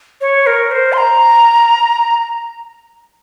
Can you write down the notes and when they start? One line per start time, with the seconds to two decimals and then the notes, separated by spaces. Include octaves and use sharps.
0.21 C#5
0.46 A#4
0.71 C5
0.93 C6
0.98 A#5